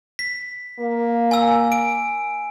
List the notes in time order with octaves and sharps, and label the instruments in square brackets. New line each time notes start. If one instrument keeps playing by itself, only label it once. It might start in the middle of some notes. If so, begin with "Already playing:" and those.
[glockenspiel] B6
[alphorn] A#3
[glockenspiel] G#5 E6
D7